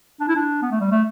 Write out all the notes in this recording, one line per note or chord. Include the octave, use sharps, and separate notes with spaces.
D4
E4
D4
B3
A3
G3
A3